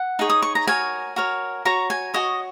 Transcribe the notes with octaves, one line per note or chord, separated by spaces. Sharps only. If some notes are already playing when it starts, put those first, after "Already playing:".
Already playing: F#5
D#4 G#4 C#5
D#6
C#6
A#5
F#4 A#4 C#5 G#5
F#4 A#4 C#5
F#4 C#5 A#5
G#5
F#4 C#5 D#5